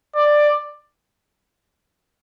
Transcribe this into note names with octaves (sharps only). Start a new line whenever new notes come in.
D5